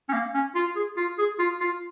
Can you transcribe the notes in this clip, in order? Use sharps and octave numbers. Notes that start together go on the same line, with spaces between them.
C#4
A#3
C#4
F4
G#4
F4
G#4
F4
F4